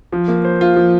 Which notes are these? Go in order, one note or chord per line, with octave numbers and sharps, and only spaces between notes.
F3
A#3
C5
F4
F3